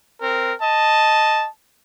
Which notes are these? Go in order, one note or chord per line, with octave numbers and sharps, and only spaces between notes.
C4 A#4
D#5 A5